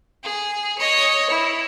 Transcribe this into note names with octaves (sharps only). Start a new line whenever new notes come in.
G#4
C#5 D#5
E4